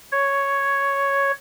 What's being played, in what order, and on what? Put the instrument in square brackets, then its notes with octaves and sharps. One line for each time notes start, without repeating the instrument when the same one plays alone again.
[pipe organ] C#5